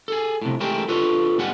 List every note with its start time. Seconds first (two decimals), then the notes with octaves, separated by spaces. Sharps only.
0.08 G#4 A4
0.42 A2 C3
0.60 G#3 A3 C4 E4 G4 A#4
0.88 F4 A4 B4 C#5
1.38 D#2 G#2 G3 G#3 B3 F#5